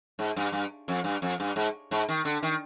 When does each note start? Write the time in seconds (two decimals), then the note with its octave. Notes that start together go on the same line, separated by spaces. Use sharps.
0.19 G#2
0.36 G2
0.52 G2
0.88 F2
1.04 G2
1.22 F2
1.40 G2
1.56 G#2
1.91 G#2
2.09 D#3
2.25 D3
2.43 D#3